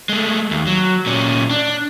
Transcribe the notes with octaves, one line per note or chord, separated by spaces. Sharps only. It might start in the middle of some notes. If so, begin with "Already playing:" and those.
G#3 A3
D#2
F#3
A#2 C#4
D4